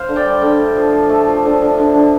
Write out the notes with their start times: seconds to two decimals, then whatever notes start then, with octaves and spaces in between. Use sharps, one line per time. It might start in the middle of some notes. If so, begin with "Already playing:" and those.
Already playing: C5 F5
0.08 D3
0.16 D5 G5
0.25 G3
0.42 D3
0.58 A3
0.77 F3
0.93 F3
1.09 A3
1.27 F3
1.45 D3
1.62 D3
1.78 D3
1.95 D3